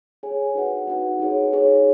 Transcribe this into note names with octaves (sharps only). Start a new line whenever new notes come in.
G#4 C#5 G#5
D#4 F#4 B4 F#5
D#4 F#4 B4 F#5
D#4 G#4 C#5
D#4 G#4 C#5